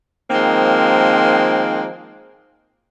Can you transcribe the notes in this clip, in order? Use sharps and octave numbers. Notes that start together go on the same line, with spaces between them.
D#3 F3 G#3 A#3 C4